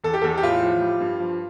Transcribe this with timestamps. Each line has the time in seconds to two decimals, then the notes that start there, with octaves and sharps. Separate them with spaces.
0.04 E2 A4
0.14 G4
0.22 E2 A4
0.38 G4
0.43 A2 F4
0.63 F3
0.81 G3
1.00 G2
1.20 F3